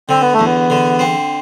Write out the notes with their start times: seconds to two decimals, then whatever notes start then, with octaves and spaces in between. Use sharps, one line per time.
0.09 D3 C4
0.21 B3
0.33 A3
0.39 E2
0.45 B3
0.70 D3
0.99 C4